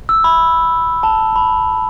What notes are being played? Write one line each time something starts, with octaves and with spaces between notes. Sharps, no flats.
E6
B5
A5
B5